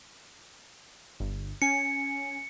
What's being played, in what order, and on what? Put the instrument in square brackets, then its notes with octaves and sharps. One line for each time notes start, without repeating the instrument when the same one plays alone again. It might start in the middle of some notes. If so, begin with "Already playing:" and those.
[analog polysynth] G1
[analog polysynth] C#4 G#5 [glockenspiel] C#7